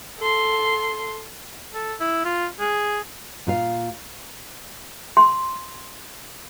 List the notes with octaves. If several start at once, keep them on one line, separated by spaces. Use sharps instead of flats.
A4 C6
A4
E4
F4
G#4
A#2 F4 F5
C6